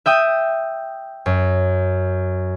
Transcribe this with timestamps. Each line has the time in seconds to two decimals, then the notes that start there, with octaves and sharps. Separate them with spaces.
0.06 E5 G5 D#6
1.26 F#2